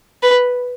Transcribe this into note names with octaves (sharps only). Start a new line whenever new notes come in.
B4